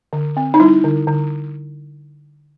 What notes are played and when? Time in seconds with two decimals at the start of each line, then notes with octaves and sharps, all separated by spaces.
0.13 D3
0.37 C4
0.54 D#4
0.60 G3 E4
0.84 D3
1.07 D3